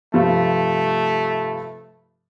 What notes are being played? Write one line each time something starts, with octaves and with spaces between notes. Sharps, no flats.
G2 C3 F3 A3